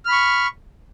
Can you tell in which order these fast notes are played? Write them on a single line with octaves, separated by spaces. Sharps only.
F6 B5 C#6